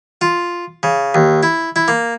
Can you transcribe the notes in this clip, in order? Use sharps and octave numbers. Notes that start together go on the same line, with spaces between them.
F4
C#3
D#2
E4
E4
A#3